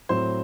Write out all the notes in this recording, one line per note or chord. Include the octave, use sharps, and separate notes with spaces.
A2 F#3 C4 C5